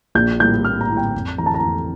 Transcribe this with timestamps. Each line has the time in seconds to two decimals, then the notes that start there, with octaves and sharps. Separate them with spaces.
0.15 A#1 G6
0.40 A2 G3 A#3 G6
0.64 A#1 F6
0.81 A#5
0.89 A2 G3 A#3
0.97 G5
1.14 F2
1.38 E3 A3 A#5
1.46 A5
1.54 A#5
1.63 F2